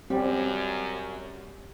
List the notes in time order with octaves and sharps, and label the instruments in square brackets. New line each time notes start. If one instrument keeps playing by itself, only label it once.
[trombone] F#2 [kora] G3 [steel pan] C4